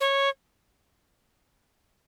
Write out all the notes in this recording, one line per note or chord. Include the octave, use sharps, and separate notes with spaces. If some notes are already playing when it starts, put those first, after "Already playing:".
C#5